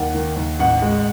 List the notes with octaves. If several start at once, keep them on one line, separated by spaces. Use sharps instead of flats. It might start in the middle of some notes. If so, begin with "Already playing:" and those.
Already playing: D#2 F#5
D#3
D#2
A1 F#5
G#3